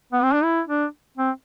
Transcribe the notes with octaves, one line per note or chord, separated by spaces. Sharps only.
B3
C4
D4
E4
D4
C4